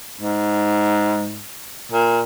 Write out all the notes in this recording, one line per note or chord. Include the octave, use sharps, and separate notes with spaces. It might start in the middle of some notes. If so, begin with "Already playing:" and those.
G#2
A#2